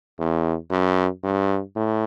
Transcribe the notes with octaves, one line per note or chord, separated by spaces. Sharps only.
E2
F#2
G2
A2